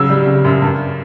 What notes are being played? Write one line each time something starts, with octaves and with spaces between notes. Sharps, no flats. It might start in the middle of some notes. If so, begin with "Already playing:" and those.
Already playing: C#3 F#3 E6
G3
C#3
F#2
G2